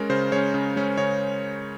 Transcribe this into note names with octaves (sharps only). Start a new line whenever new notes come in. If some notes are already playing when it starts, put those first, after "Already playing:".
Already playing: G#3 C#4 A#4
C#3 C5
G#3 C#4 C#5
C#3
G#3 C#4
C#3 C#5